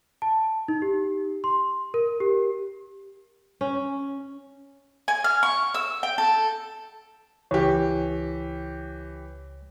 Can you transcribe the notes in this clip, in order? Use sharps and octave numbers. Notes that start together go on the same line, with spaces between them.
A5
D#4
G4
C6
A#4
G4
C#4
G#5
F6
C#6
E6
G5
A4
C#2 E3 G4 C#5